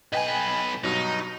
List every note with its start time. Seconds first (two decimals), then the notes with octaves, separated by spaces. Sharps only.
0.12 B1 B4 D#5 G5 G#5
0.84 G2 B2 F#3 D#4